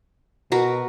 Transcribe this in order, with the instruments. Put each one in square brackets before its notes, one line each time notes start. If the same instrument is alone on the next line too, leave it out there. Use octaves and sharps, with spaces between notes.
[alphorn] B2 [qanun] F#4 A#4 B4